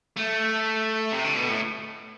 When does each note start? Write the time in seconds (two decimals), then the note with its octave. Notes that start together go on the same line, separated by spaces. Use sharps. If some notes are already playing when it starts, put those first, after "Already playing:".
0.17 A3
1.12 C3
1.24 D3
1.36 B2
1.48 A2